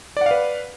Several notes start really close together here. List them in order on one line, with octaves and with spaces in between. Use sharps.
D5 F#5 F5 B4